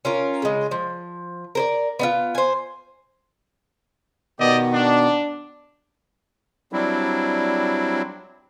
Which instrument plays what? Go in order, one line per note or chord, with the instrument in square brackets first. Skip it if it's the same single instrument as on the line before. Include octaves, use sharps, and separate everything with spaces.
[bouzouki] C#4 F4 A#4
C#3 G#3
F3
A#4 C5 D5
B3 D#4 F4
C5 G#5
[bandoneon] B2 D#3 B3 [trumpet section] G4 D5 D#5
[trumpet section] D4
[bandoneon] F#3 G3 C4 D4 E4